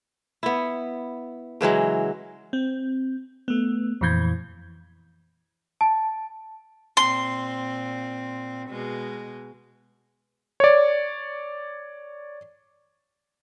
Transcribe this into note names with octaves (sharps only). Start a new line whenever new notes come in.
B3 E4
C#3 E3 F#3 G#3
C4
A3 B3
F2 A#2 E3 G6 G#6
A5
A#2 C4 C6
B2 G#3
C#5 D5